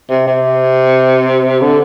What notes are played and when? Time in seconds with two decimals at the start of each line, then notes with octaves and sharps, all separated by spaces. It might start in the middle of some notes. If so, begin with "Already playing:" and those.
0.10 C3
0.27 C3
1.61 D3